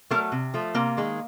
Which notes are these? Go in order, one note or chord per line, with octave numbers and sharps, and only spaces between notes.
F#3 A3 A#3 A#4
C3
F3 A3
C3 A#3 A#4
D#3 G#3